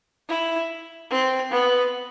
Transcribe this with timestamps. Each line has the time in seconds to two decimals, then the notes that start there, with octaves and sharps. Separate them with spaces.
0.29 E4
1.11 C4
1.51 B3